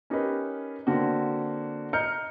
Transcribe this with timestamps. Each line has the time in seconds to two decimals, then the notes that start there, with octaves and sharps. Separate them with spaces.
0.10 C#4 D#4 G4 A#4 B4
0.87 D3 A#3 C4 F#4
1.93 D#5 A#5 F6 G6 C#7